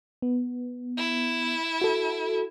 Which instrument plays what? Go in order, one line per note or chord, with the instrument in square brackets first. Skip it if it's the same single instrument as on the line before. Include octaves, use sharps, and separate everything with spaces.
[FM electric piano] B3
[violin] E4
[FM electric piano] F#4 A4